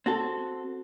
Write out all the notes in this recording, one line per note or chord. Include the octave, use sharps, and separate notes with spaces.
C4 F#4 A4